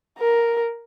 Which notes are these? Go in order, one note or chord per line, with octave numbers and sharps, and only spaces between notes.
A#4